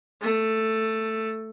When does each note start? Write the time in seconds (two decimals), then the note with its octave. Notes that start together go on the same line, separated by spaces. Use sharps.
0.21 A3